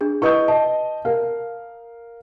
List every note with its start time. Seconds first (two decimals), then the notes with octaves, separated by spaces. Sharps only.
0.01 D4 G#4
0.22 E4 B4 D#5 C#6 D#6 G6
0.48 D#5 A5
1.05 A#4 F5